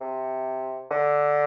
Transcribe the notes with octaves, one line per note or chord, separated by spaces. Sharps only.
C3
D3